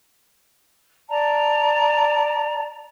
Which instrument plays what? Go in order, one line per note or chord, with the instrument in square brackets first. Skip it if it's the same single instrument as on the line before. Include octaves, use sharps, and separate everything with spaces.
[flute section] D5 A5 A#5